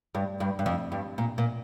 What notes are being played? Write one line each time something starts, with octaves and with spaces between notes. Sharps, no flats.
G2
G2
G2
F2
G2
A#2
A#2